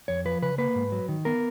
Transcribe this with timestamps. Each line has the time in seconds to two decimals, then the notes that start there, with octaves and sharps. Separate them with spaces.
0.08 F2 C#5
0.25 F3 B4
0.42 C#3 B4
0.58 A#3 B4
0.75 G#2
0.92 F#3
1.08 D#3
1.25 B3 A#4